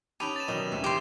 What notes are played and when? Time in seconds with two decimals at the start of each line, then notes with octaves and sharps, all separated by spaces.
0.20 C#4 D#4 G4 B4 A5 B5 D#7 F7
0.36 A6 E7
0.48 B2 D#3 F#3 G3 D#5
0.72 D2 A2 C#4 A4 E5
0.84 C#3 E3 G4 C6 A#6